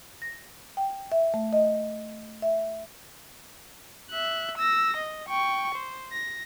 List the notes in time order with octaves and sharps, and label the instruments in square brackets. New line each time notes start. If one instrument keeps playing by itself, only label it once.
[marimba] A#6
G5
E5
A3
D#5
E5
[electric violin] E5 F#6
E6 A#6
D#5
G5 C#6
C5
A#6